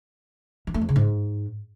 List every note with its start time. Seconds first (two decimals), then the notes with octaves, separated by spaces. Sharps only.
0.67 E3
0.74 A3
0.81 F2
0.89 C#3
0.96 G#2